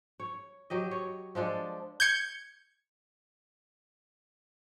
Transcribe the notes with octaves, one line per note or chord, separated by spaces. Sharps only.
C#5
F#3 G4 D#5
C#5
F3 G#3 D4 A4
G6 G#6 C#7